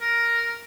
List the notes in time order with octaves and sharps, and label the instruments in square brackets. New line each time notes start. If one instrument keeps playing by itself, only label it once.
[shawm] A#4